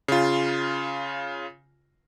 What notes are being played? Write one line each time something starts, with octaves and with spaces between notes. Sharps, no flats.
C#3 F4